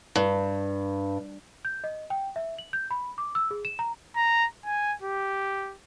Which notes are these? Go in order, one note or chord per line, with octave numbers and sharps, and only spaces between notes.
G2
G6
D#5
G5
E5
F#7
G6
B5
D6
E6
G#4
E7
A#5
A#5
G#5
G4